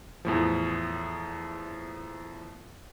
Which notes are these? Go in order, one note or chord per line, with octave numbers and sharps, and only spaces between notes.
E2 A2 F3